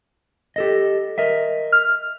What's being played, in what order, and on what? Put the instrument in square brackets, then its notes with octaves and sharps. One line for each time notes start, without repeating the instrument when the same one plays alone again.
[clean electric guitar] G4 A4 D#5
A#4 D#5 E5
[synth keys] F6